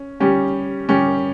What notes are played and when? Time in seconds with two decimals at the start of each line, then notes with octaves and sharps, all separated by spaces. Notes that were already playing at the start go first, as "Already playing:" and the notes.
Already playing: C#4
0.20 G3 C#4 G4
0.89 G3 C#4 G4